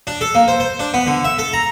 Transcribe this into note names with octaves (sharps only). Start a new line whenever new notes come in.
D4
A4
A#3
C5
C5
D4
B3
D3
E5
A4
A#5